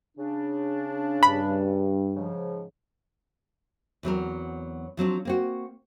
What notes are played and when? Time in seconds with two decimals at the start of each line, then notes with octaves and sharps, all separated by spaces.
0.17 C#3 D4
1.23 G2 B5
2.15 G#2 C#3 F3
4.03 E2 F#3 C4 A#4
4.97 F3 F#3 C4 D4
5.25 A#3 C4 F#4